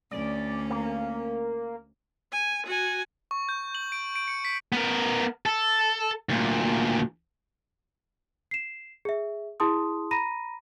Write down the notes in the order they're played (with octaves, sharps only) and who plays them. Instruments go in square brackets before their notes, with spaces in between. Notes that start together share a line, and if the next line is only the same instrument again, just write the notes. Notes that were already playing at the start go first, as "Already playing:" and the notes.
[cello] D2 C#4 [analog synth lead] D5
[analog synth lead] A#3
[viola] G#5
F#4 G#5
[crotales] C#6
G6
F#7
D7
D7
C#7
B6
[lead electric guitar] B3 A#4
A4
D2 A#2
[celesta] C7 E7
G#4 E5
E4 G#4 A5 C6 D#6
A#5 B5 A#6 D#7